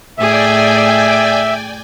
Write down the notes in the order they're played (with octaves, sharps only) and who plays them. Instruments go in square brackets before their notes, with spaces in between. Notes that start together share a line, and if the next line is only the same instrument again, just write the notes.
[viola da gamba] A2 G#4 [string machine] D5 G5 G#5 [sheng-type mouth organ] E5